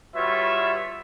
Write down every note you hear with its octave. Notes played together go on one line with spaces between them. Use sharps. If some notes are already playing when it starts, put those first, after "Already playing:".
G3 F4 F#4 B4 C#5 E5